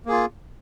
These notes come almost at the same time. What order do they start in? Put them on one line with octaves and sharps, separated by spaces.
A#3 G#4 F4